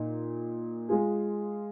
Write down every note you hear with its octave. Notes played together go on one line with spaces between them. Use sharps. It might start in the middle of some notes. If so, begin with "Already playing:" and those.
Already playing: A#2 D#4
G#3 F4 G#4